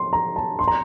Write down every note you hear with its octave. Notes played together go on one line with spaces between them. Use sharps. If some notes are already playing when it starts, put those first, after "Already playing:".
Already playing: C6
A#5
A5
C6
A#5